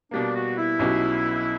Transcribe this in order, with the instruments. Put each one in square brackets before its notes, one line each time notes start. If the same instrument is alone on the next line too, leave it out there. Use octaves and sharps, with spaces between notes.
[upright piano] B2 G3 A#3 [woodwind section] D4
[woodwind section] F#4
E4
[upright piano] B1 B2 F#3 C#4 G4